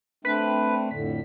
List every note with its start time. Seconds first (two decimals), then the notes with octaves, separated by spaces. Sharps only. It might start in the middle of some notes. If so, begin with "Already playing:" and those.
0.25 A3 C4 D4 B4
0.91 F2 A2 D3 B6